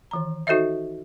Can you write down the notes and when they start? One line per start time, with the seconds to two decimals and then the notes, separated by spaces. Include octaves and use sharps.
0.11 D#3 E3 A#5
0.47 D#4 F#4 A4 C5 D#5 E5